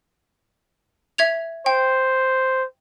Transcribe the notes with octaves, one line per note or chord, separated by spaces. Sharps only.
E5 G#6 F7
C5 G5